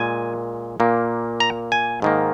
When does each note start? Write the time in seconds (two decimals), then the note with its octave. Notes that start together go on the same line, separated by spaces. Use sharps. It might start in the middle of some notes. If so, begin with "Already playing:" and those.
Already playing: A#2 G#3 G#5
0.80 A#2 A#3
1.40 A#5
1.72 G#5
2.02 G#2 D#3 A#3